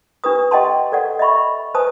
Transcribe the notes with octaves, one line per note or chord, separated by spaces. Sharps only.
D4 G4 B4 D#6
G4 D#5 F#5 G5 A5 C6
A4 D5 F#5
D#5 E5 B5 C#6
B4 C5 G#5 A5 D#6